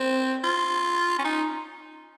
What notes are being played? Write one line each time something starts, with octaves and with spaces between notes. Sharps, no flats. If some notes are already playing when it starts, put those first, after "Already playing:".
Already playing: C4
F4
C#4
D#4